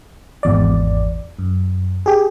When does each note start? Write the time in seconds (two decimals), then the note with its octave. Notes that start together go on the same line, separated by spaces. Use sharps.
0.43 G#1 E2 D5
1.39 F#2
2.06 G4 G#4